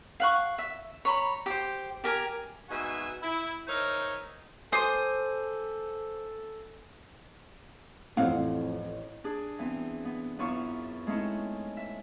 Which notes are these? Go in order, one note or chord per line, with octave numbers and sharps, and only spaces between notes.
F5 F#5 C#6
E5
C#5 A#5 B5
G4 C5
G4 A#4 G#5
G#2 B2 F#4 E5 G#5
E4
D#4 A#4 C5 C#5 D#5 E5
A4 C5 G#5 D6 D#6 D#7
A1 F2 A2 C4 F5 F#5
D4 G#4
E3 B3 C4
B3
F#2 B3 E4 F4 C#6
G#3 A3 C4 C#4 D#4 E4
E5